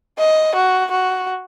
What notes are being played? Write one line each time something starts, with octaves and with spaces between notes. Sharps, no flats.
D#5
F#4
F#4